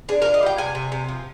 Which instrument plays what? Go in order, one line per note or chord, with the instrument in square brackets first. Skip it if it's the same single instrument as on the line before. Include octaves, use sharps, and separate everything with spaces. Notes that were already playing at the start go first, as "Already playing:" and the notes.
[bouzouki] D4 G#4
A#4
F4
D#5
G3 G5
C3 G#5
C3
C3
F3